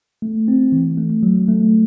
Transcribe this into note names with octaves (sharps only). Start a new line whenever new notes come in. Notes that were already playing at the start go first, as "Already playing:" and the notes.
A3
C4
E3
A3
F#3
A3